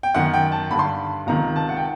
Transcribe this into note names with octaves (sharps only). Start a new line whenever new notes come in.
G5
F#2 D#3 F#5
G5
A5
G2 D3 B5
C6
B5
C#2 C3 D#3 A#5
A5
F#5
G5